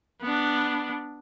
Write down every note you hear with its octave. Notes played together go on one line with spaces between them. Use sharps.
B3 D4